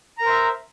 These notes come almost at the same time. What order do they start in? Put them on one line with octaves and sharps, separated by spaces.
A#5 A#4 C5 E5